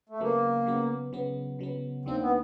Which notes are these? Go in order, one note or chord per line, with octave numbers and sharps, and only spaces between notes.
A3
C#3 F#3 A#3 B3
C#3 F#3 B3
C#3 F#3 B3
C#3 F#3 B3
D#2 D#3 F#3 A#3 C4 D4
B3